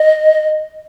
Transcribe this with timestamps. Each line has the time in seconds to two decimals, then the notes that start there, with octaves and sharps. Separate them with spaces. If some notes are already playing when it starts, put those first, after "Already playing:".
Already playing: D#5